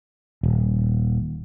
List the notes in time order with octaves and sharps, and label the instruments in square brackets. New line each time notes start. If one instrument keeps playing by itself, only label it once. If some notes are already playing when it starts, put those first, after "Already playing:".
[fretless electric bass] D#1